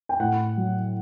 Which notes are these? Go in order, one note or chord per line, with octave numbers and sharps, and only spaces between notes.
G5
A2 F#5
F#3